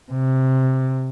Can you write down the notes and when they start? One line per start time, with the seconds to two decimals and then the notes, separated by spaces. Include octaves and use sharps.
0.12 C3